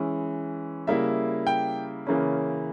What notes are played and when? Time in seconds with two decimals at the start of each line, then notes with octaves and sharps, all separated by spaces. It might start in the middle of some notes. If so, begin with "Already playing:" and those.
Already playing: E3 G#3 C#4
0.87 C#3 G3 A#3 E4 E5
1.47 G5
2.07 C#3 E3 A#3 C#4